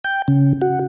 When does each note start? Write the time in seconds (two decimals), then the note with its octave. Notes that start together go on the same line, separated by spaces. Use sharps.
0.04 G5
0.28 C#3
0.62 F#4